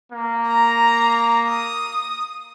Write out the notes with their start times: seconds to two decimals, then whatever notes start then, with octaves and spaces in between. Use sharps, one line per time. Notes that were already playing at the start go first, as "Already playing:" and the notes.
0.12 A#3
0.48 A#5
1.48 D#6